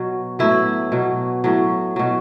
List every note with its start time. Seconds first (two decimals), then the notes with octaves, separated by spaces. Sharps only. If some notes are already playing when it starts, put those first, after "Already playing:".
Already playing: B2 F#3
0.39 A2 F#3 B3 E4
0.92 B2 F#3
1.44 A2 F#3
1.96 B2 F#3